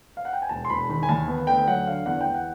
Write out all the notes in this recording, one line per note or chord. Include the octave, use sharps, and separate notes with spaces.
F5
F#5
G5
G#5
E1 A5
C6
E1 B5
D#3 B5
G#5
D#2 A5
B3
D2 G5
F#3 F#5
D3 F5
E2 F#5
E2 G5
F#5